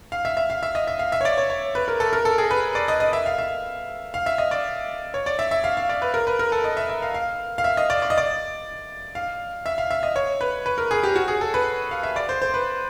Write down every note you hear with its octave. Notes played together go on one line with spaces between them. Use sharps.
F5
E5
E5
F5
E5
D#5
E5
F5
E5
C#5
D5
C#5
C#5
B4
A#4
A4
A#4
A4
G#4
B4
D5
D#5
D#5
E5
F5
E5
F5
E5
D#5
D5
C#5
D5
E5
E5
F5
F5
D5
B4
A#4
B4
A#4
A4
D#5
E5
E5
F5
F5
F5
E5
D#5
D5
D5
D#5
D5
F5
E5
F5
E5
D#5
C#5
B4
B4
A#4
G#4
G4
F#4
G#4
A4
B4
F5
E5
D5
C5
C5
B4